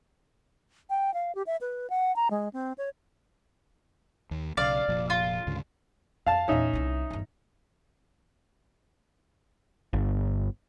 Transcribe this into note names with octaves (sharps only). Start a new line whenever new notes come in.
G5
F5
G4
E5
B4
F#5
A#5
G#3
C4
C#5
D#2
B1 C#3 D5 F5
F1 A#2 F3
F4
D2 G#2 C#3
F2 F5 A5
E2 A#2 C#4 D#4 E5
C2 E4
G1 E2
G1